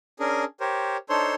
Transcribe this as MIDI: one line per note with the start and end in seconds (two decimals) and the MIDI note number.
0.20 0.44 61
0.20 0.44 62
0.20 0.44 68
0.20 0.44 70
0.60 0.97 67
0.60 0.97 70
0.60 0.97 72
0.60 0.97 73
1.10 1.35 62
1.10 1.35 63
1.10 1.35 69
1.10 1.35 72
1.10 1.35 73
1.10 1.35 84